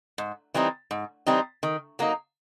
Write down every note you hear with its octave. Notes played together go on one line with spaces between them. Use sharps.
G#2
E3 G3 C4 D#4
G#2
E3 G3 C4 D#4
D#3
F#3 A#3 D#4